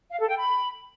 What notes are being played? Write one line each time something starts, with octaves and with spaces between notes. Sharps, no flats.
F5
A4
G5
B5